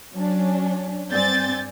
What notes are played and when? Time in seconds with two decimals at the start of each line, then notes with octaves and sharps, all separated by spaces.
0.15 F#3 C#4 D4
1.12 G2 C4 D5 G#5 G6 A6